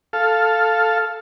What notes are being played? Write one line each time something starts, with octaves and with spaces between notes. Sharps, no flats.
A4 F5